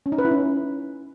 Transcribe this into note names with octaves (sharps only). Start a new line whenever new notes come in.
C#4
D#4
B4
E4
C#4